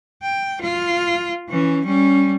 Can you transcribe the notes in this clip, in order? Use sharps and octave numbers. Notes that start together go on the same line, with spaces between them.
G5
F4
E3 C#4
G3 C#4